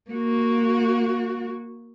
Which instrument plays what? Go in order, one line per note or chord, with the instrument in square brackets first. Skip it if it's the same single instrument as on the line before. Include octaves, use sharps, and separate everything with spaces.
[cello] A#3 F#4